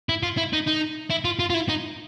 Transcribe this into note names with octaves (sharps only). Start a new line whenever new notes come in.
E4
F4
E4
D#4
D#4
E4
F4
F4
F4
E4
D#4